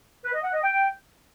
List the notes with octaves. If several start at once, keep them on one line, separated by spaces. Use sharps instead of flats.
B4
D#5
F#5
D#5
G5